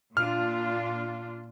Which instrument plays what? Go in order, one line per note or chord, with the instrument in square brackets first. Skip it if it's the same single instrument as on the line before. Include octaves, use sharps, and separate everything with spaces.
[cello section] A#2 D4 F4 [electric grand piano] F6